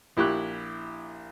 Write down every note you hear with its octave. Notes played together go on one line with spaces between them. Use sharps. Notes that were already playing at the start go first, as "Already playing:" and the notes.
A#1 E4 G4 C#6 F#6